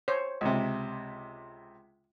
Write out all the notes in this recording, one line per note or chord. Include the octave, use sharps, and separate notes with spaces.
C5 C#5
C#2 C3